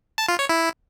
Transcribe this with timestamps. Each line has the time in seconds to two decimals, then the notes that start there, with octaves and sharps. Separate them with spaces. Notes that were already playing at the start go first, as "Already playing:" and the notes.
0.18 A5
0.29 F4
0.39 C#5
0.49 E4